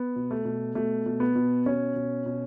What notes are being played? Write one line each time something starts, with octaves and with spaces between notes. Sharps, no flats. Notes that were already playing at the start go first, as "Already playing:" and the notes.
Already playing: B3
B2
A3
B2
B2 A3
B2
B3
B2
B2 C#4
B2
B2